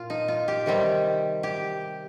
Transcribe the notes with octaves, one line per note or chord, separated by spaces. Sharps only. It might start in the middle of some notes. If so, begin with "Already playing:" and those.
Already playing: A#2 F4
D#4
F4
G4
C3 D#3 G3 C4
G4